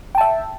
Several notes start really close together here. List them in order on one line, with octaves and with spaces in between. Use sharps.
G5 A5 E5